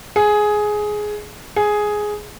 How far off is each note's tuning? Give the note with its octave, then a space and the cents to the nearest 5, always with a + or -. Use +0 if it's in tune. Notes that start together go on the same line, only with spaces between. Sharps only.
G#4 +10
G#4 +5